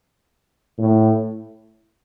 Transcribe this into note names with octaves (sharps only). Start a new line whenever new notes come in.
A2